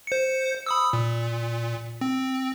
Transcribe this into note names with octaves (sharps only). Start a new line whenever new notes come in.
C5 C#7
B5 D#6 E6
A#2
C4